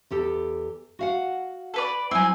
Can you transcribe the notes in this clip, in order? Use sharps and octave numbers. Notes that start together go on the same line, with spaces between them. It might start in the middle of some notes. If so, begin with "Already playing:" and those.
E2 G4 A4
F#4 F5 F#5
A4 B4 D5
F#3 C4 E4 G#5